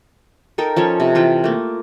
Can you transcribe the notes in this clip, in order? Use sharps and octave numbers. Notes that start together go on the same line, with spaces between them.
D#4 A4 A#4 G5
F3 C#4 A4 C#5
C3
E3 F4 A4 G5
A3 A#3